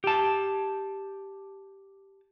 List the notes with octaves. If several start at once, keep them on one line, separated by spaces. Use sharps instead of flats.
G4 A5